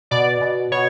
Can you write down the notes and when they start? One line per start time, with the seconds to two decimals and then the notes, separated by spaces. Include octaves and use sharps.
0.11 B2 D5
0.41 B2
0.72 B2 C#5